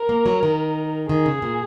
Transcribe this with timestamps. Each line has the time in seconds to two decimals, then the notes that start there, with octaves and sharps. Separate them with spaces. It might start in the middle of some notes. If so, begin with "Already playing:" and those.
Already playing: A#4
0.09 A#3
0.26 F#3
0.43 D#3
1.09 D#3 G#4
1.26 C#3
1.42 A#2